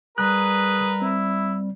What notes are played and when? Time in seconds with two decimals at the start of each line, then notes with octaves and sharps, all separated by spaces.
0.18 G3 G#4 A#4 B4 A#5 F#6
1.02 C4 E4